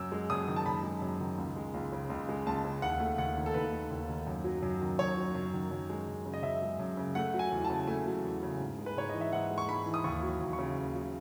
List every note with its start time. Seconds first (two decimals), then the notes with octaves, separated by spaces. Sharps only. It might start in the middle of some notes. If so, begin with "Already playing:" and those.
Already playing: F#2 E6
0.12 G#3
0.30 F#2 D#6
0.48 D#3
0.56 A5
0.66 F#2 B5
0.83 G#3
1.02 F#2
1.20 D#3
1.38 C#2
1.56 G#3
1.74 C#2
1.92 C#3
2.10 C#2
2.29 G#3
2.46 C#2 A5
2.65 C#3
2.82 D#2 F#5
3.00 A3
3.18 D#2 F#5
3.37 D#3
3.46 A4
3.54 D#2 B4
3.73 A3
3.91 D#2
4.09 D#3
4.27 F#2
4.44 F#3
4.62 F#2
4.81 D#3
4.99 F#2 C#5
5.17 F#3
5.35 F#2
5.53 D#3
5.71 F#2
5.90 G#3
6.08 F#2
6.26 C#3
6.34 D#5
6.43 F#2 E5
6.62 G#3
6.79 F#2
6.97 C#3
7.15 A3 F#5
7.34 F#3
7.39 G#5
7.52 E2
7.64 A5
7.70 C#3
7.87 A3 G#5
8.07 F#3
8.24 E2
8.43 C#3
8.60 G#2
8.78 G#3
8.86 B4
8.97 G#2 C#5
9.09 E3 D#5
9.21 E5
9.32 G#2 F#5
9.51 G#3
9.58 C#6
9.69 G#2 B5
9.86 E3
9.94 D#6
10.04 D#2 C#6
10.23 F#3
10.41 D#2
10.53 C#6
10.59 C#3
10.77 D#2
10.95 F#3